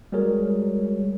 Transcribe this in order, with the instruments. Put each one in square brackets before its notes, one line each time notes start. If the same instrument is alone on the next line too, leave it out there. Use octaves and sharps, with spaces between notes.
[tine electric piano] G3 G#3 F#4 G#4 A#4 C#5